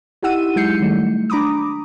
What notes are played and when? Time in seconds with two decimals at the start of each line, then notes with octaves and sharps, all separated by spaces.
0.22 D#4 E4 G4 F#5 E6 D#7
0.56 F#3 G#3 E4 G6 C7 C#7
0.80 D#3 G3 A3
1.30 D4 A#5 B5 D6 D#6